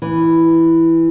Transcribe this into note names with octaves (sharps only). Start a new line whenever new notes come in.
E3